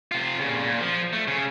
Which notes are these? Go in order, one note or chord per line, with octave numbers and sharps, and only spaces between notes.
C3 F4
A#2 C#3
A#2
F3
A3
C#3